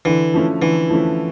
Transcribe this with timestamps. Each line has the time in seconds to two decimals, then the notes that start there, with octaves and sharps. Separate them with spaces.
0.05 D3 E3
0.34 F3 A3 C#4 E4
0.62 D3 E3
0.89 F3 A3 C#4 E4